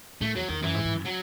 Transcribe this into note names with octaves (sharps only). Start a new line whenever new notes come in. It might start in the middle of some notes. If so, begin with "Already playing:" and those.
A2 A3
E2 F#3
E2 D#3
F#2 E3
G#2
G#2
F#2
F#3